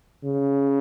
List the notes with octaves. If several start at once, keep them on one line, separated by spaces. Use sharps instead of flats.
C#3